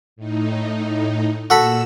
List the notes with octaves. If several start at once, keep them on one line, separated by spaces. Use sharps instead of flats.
A2 D#4
A#2 F#4 A4 B5 E6